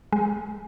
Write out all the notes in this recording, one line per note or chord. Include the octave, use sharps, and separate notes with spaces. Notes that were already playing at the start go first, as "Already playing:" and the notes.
G#3